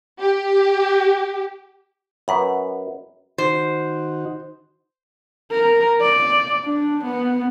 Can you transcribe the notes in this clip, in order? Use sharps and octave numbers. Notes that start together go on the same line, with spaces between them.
G4
F#2 B4 F#5 B5
D#3 D#4 F#4 C5
A#4
D5
D4
B3